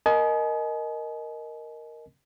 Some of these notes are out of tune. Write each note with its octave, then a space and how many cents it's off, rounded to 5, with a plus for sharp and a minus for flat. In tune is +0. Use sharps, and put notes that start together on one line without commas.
A#4 +0 D#5 +0 G#5 +40